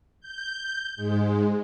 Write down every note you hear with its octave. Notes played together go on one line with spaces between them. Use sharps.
G6
G#2 G#3